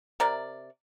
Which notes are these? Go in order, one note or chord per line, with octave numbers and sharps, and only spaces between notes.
C3 A#4 D5